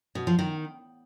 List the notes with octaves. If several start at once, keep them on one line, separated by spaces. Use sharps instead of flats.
B2
F3
D#3